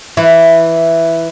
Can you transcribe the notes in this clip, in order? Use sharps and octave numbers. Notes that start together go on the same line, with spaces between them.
E3